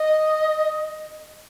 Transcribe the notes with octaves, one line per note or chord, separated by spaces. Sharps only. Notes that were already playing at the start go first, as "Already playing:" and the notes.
Already playing: D#5